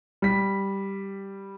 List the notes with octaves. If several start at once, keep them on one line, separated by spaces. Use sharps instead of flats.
G3 B6